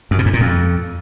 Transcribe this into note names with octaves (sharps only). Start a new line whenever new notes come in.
F#2
B2
G#2
A#2
F2